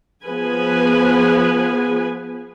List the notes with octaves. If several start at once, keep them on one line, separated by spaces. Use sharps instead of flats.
F3 B3 G#4 B4 G#5